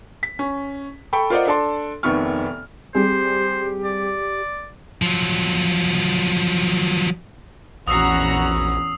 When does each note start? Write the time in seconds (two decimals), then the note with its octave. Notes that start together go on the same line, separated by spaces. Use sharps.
0.23 B6
0.39 C#4
1.13 A4 G5 B5 C#6
1.30 F4 A#4 C5 D5 D#5 F#5
1.47 D4 A4 D5 A5 C6
2.03 F1 C3 D#3 B3 C#6 F6
2.95 G3 C4 G4 G#4 C5
3.84 D5
5.02 F3 F#3
7.88 A#1 E2 C#4 F#4 A#5 D#6 E6 C7